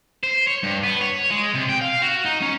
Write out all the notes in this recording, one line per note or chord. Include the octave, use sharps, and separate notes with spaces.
C5
C#5
G2
B3
C#5
G#3
C3
G5
F5
F#4
D#4
C#4